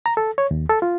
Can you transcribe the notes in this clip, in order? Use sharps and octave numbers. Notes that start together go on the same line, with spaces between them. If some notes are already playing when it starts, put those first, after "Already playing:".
A#5
A4
C#5
D#2
A4
F4